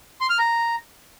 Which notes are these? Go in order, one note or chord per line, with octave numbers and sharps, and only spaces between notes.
C6
F6
A#5